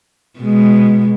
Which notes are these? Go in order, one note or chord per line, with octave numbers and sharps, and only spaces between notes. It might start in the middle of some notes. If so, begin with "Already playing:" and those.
B2 G#3